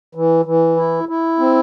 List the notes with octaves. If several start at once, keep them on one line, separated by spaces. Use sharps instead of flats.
E3
E3
E4
E4
C4